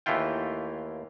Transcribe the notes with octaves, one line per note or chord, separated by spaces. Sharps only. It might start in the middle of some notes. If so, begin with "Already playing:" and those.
D#2 E3 A3 E4 F4 G5